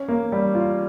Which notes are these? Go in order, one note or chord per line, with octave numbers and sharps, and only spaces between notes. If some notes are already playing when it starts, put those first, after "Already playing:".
Already playing: C#4
A#3
G3
F4